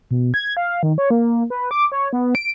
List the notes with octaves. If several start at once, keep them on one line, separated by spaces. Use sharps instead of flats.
B2
G#6
F5
D#3
C#5
A#3
B4
D6
C#5
B3
D7